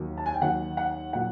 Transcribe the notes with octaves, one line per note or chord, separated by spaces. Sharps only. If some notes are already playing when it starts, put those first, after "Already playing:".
Already playing: D#2 D#3 F#3
A5
G#5
G5
D#2 D#3 F#3 F#5
F#5
A#2 F#3 F#5